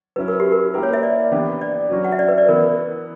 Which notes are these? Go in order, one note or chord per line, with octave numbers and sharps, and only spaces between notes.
F#3 C#4 E4 B4
A#4
G4
A#4
A#3 E4 G4 A#4 B4
C#5
E5
D5
E3 B3 D4 G4 B4
D5
F#3 C#4 F#4
F#5
E5
D5
B4
D5
E3 B3 A#4